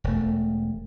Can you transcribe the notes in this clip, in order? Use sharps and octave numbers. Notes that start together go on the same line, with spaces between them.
E1 A3